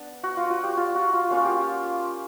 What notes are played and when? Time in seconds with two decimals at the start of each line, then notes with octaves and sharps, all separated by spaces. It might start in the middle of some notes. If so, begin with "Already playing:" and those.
Already playing: B3 D4
0.23 F#4
0.37 F4
0.50 F#4
0.64 G4
0.77 F4
0.95 F#4
1.13 F4
1.31 A#3 C#4 F4 F#4
1.45 G4